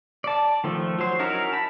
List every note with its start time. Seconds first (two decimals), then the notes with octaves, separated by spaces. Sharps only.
0.24 D5 A5
0.64 D#3 F3 A3
0.99 F#3 C5
1.19 C#4 D#4 E4 F#4 A#4
1.53 A5 B5